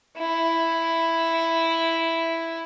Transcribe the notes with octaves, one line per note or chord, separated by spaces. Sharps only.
E4